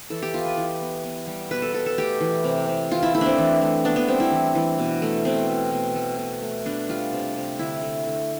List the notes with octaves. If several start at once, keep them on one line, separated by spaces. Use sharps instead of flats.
E3 A4
G4
B3 F4
B4
E3
B3
B3
G3
B2 B4
A4
B2 A4
A4
A3 G4
E3
C3
C3
E3 F4
E4
A3 E4
C4 D4
E3
A3
B3 D4
B3
G3 C4
E4
E3
E3
B2
A3
B2 C4
A3
B2
A3
B2
A3
B3 D4
G3 F4
C3
C3
D3 E4
A3
D3